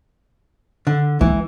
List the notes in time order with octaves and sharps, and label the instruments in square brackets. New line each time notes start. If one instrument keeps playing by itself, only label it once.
[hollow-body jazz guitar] D3
[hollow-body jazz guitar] E3 [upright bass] G#3 B3